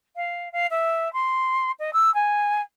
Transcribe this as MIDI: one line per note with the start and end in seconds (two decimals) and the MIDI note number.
0.16 0.49 77
0.52 0.67 77
0.70 1.11 76
1.13 1.71 84
1.79 1.93 75
1.93 2.13 88
2.14 2.61 80